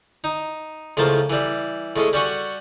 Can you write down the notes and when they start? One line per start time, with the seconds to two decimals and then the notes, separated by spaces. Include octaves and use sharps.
0.24 D#4
0.97 C#2 A2 F3 A#3 A5
1.30 E3 G3
1.96 A2 G#3 C#4
2.13 G3 C#4 F#4